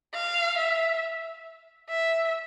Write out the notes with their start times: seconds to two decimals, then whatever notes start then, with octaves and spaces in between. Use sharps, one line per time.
0.14 F5
0.58 E5
1.89 E5